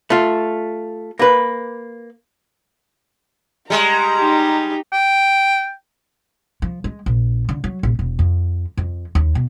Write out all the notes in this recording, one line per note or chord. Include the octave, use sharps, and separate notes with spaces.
A3 F4
A#3 B4
G3 G#3 A#5
D#4 G4
G5
F3
G#3
A#1
D3
F#3
A#1
E1
F2
F2
D#2
B2